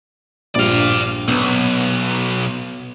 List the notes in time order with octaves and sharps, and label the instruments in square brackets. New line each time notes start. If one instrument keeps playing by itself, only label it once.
[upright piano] A#1 G2 [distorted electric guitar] D5 F5
[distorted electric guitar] B1 [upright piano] B3